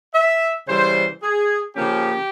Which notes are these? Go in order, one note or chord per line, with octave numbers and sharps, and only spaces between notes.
E5
C#3 E3 G3 C5
G#4
C#3 F3 A#3 C#4 G4